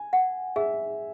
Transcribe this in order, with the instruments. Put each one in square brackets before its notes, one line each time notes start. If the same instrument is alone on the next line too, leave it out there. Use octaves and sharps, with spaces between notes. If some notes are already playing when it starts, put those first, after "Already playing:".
Already playing: [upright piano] G#5
[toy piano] F#5
[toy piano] G#4 [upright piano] E5